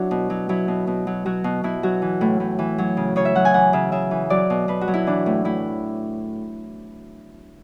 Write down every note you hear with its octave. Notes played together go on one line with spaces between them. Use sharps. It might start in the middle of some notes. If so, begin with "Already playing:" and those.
Already playing: F#3 D4 E4 F#4
B2
F#3
F#3 E4
B2
B2
F#3
F#3 F#4
B2
B2 E4
F#3 F#4
E3
A2
A2
E3
F#3
C#3
C#3 C#5
E5
F#3 F#5
G#5
E3 F#5
C#3 E5
C#3 E5
E3
F#3 D5
B2
B2 B4
F#4
F#3
E4
E3 D4
A2
A2 E4